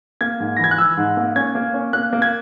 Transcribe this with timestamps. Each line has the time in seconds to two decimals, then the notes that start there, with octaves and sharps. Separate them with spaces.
0.21 A#3 G#6
0.40 G#2
0.57 A#6
0.59 E3 G#6
0.71 F#6
0.78 E3 E6
0.97 G#2
1.17 A#3
1.36 C#4 G#6
1.55 A#3
1.74 C#4
1.93 A#3 F#6
2.13 A#3
2.22 G#6